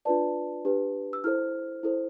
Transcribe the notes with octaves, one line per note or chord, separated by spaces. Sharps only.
D4 F4 B4 D5 A5
D4 G4 B4
E6
E4 A4 C5 F6
E4 A4 C5